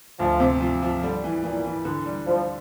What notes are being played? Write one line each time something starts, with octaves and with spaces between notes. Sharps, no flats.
D2 F3
C3
F3
F3
D3 G3
E3
A#2 E3
E3
D3
G3
F3 G3